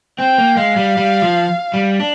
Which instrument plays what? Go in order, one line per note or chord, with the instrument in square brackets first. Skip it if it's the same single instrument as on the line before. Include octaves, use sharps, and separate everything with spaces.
[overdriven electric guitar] C4 [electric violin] G5
[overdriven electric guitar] A#3
[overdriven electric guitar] G#3 [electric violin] F5
[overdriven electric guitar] G3
G3
F3
G3
D4